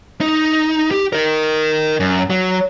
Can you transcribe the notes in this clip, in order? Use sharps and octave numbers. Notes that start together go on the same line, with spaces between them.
D#4
G4
A#4 D#5
F#2
F#3